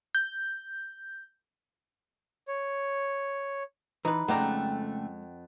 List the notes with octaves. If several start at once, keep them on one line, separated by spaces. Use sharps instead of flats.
G6
C#5
E3 D#4 B4
F2 C#3 G#3 A3 D5 F#5 G5 A#5